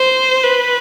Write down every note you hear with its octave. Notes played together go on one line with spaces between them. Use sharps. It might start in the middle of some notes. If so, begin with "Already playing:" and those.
Already playing: C5
B4